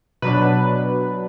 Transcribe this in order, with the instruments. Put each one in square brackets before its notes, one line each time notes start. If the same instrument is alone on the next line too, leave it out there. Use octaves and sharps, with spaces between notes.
[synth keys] B2 F#3 D4 B4